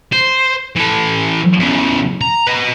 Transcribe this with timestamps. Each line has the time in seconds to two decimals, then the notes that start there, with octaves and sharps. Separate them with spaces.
0.13 C5
0.76 E3 A4
1.59 E2 C#3
2.21 A#5
2.47 B4 D#5